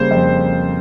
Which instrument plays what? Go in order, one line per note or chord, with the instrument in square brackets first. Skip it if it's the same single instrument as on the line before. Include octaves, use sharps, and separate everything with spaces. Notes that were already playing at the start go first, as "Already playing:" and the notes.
Already playing: [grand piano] C#3 G3 A#3 [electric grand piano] C5
[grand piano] F2